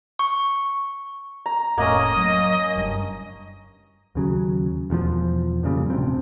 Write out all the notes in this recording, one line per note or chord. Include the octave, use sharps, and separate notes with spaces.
C#6
A#5
F1 A2 A#3 C#4 D#5
F#3
F#1 G2
D#2 C#3 F#3
E1 E2 C3 F3
F2 A#2 C#3 G3
D1 D2 C3 C4